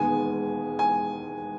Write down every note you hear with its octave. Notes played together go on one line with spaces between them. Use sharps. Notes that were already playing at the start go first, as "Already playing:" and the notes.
Already playing: E1 D#2 D#3 G#3 B3 G#5
G#5